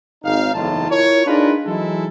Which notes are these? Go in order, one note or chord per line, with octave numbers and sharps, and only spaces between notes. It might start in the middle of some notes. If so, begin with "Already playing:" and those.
G#1 D#4 F5
F#1 E2 A2 D#4 F4 A5
E4 F4 A#4 C#5
D4 D#4 F4 G#4 A#4 B4
E3 F#3 G#3 D#4 E4 A4